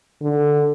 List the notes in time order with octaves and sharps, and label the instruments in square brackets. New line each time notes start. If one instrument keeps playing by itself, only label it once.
[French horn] D3